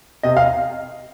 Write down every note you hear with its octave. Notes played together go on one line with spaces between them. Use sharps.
C3 D#5
F5